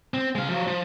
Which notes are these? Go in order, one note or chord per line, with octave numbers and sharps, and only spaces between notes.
C4
G#3 F5
F3 F#3
F3